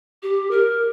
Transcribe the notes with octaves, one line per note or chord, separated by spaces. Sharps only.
G4
A#4